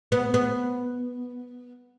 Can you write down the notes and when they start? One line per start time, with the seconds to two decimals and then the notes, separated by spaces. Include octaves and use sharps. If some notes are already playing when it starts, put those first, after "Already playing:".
0.12 B3
0.34 B3